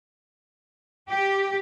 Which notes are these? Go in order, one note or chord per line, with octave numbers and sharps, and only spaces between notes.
G4